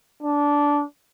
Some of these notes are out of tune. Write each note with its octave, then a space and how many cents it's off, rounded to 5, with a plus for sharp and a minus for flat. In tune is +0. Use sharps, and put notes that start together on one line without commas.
D4 -15